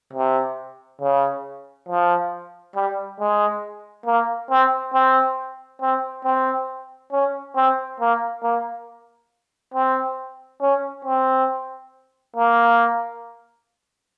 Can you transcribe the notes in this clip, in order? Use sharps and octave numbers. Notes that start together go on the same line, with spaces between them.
C3
C#3
F3
G3
G#3
A#3
C4
C4
C4
C4
C#4
C4
A#3
A#3
C4
C#4
C4
A#3